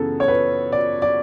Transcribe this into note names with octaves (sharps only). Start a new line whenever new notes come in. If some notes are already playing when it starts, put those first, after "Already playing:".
Already playing: F#2 C#3 E3 B3 G#4 A4
C#5
B4
D5
D5